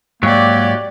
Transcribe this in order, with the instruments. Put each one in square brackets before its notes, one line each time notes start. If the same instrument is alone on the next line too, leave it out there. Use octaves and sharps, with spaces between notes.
[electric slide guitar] G#2 F#3 [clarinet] A#3 [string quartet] G4 D5